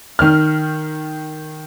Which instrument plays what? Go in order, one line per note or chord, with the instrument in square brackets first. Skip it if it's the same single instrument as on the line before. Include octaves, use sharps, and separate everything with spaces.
[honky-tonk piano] D#3 F6